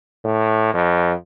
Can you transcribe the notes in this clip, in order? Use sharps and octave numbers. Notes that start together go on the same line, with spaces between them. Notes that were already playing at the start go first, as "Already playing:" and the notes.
A2
F2